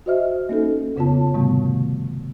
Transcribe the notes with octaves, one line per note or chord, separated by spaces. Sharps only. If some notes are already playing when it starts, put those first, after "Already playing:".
F#4 C5 D#5 E5 F6
A#3 C#4 D#4 A4
F2 C#3 B3 F4 C#5 A5
G#2 C3 D#3 G3 A3 B3